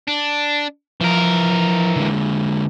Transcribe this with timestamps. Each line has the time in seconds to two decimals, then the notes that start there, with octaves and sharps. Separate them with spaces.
0.08 D4
1.01 E3 F3 A#4
1.96 D3 G#3